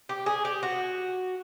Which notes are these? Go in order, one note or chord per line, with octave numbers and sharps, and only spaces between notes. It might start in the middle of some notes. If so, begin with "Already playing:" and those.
G4
G#4
G4
F#4